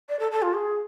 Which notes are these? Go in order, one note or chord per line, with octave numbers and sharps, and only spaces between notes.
D5
A4
A4
F4
G#4